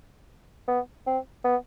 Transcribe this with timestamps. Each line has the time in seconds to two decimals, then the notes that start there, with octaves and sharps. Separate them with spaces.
0.68 B3
1.07 C4
1.44 B3